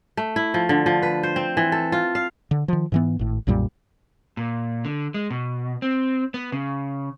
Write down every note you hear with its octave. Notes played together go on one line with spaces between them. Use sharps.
A3
E4
F3
D3
F3
B4
C5
C4
E3
A4
F4
F5
D3
D#3 F3
G#2 E3 B3
G#1 A2
B1 F#2 A#2 G3
A#2
D3
G#3
B2
C4
B3
C#3